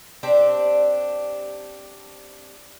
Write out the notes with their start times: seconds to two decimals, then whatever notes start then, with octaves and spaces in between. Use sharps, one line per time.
0.23 C4 D4 G4